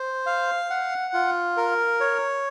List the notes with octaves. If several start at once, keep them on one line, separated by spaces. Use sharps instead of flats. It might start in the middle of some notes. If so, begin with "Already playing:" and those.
Already playing: C5
F5
F#5
F4
A#4
C#5